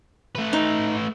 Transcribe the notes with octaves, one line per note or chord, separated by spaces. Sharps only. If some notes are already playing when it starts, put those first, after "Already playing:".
A3 B4
D#4